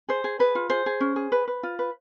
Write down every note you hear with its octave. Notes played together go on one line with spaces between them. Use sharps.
G#4 C5
G#4
G#4 B4
F4
G#4 C5
G#4
C#4
G#4
B4
B4
F4
B4